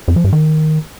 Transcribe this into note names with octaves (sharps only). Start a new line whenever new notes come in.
F2
F3
G2
D#3